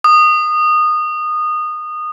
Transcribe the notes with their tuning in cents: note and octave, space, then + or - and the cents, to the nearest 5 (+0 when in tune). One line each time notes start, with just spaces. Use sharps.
D#6 -20